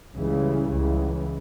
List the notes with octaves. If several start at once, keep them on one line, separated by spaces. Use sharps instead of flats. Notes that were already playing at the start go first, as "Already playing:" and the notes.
C#2 C#3 E3 G3
C#2 C#3 E3